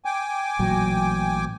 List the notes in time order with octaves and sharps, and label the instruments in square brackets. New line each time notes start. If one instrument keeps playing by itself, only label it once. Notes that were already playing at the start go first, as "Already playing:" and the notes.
[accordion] G5 G#5 D6
[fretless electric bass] A1 A#2 F#3